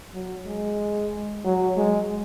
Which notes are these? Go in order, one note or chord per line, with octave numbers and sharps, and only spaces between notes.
F#3
G#3
F#3
G#3